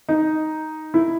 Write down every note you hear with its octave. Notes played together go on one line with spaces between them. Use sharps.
D#4
E4